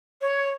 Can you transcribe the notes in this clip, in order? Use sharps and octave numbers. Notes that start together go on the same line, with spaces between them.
C#5